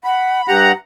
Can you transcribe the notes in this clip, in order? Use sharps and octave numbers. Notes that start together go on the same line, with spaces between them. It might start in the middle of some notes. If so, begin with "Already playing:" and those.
F#5 B5
G2 G4 F#5 A#5